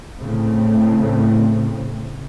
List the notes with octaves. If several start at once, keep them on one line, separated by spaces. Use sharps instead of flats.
A2 C#3 A3 C4